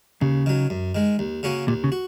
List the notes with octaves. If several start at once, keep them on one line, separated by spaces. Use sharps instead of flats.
D#2 C#3
D#3 F#3
F#2
D#3 G#3
D#2
C#3 A#3 C#4 F#4
D#2 A#2
C#3
F#4